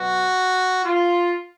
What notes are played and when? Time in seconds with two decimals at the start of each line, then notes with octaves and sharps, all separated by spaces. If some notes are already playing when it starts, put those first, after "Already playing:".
Already playing: B2 F#3 F#4
0.83 F4